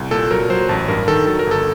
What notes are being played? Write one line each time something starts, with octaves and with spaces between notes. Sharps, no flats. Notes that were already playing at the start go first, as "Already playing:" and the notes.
Already playing: C2
A#2 A4
F#3 A#4
F#3 C5
A1 A5
G2 A#4
D#3 A4
F#3 A4
A#4
G1 A4